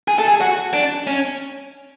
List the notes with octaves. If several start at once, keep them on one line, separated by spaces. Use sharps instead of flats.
G#4
A4
G#4
F#4
D4
C#4